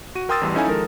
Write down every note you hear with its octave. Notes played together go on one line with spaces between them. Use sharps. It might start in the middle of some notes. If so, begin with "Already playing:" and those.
F#4 D#7
A#4 G5 C6 D#6 E6 A6
A1 E2 E3 G3 C6
C#4 D#4 E4 A4 F5 G#5
D#3 F3 G#3 A4 A#4